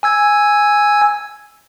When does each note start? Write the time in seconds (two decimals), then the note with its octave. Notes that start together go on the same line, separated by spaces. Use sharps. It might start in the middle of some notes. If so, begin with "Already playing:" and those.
0.03 G#5 E6 G#6